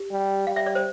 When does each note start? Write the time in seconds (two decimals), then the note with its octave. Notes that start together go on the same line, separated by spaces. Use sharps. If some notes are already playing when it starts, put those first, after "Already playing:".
Already playing: G4
0.11 G3
0.47 G3 F5
0.56 E5
0.66 D5
0.75 C5